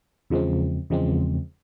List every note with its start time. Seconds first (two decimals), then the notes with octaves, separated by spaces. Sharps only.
0.30 E2 C#3 F3 G#3 C4
0.90 E2 C#3 F3 G#3 C4